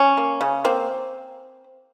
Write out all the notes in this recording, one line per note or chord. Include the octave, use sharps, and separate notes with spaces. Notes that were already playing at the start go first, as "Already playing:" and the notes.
Already playing: C#4
A#3
C#3
A#3 C4